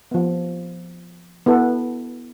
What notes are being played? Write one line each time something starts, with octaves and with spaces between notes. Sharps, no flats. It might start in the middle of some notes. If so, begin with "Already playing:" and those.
F3 B3
B3 E4 A4